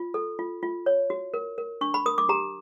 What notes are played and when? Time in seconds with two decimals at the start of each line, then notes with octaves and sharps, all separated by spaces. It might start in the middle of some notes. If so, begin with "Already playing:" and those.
Already playing: F4
0.14 A4
0.39 F4
0.63 F4
0.86 C#5
1.10 F#4
1.34 A#4
1.58 A#4
1.81 D4 C#6
1.94 B5
2.06 A#4 D#6
2.18 D6
2.29 G4 A#5